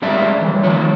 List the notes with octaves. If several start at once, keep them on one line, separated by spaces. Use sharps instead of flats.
G#2 G3 C#4 D5 E5 A5
E3 G3
D#3 F3 C#5